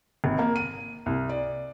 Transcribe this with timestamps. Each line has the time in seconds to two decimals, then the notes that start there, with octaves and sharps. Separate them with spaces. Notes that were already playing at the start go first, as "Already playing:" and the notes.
0.24 G#1
0.39 A#3
0.56 D#7
1.06 C2
1.29 D5